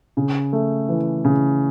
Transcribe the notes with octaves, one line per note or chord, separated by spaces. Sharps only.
C#3
A3
E3
C#3